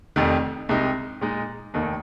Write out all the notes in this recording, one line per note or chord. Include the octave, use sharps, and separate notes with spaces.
F1 F2 C3 D#3
C2 C3 G#3 D#4
A#2 G#3 D#4
F1 D#2 D#3 A#3